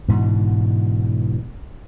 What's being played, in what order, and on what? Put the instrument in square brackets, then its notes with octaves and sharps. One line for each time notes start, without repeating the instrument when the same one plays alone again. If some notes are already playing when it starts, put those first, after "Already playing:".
[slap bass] G#2 B2 D3 E3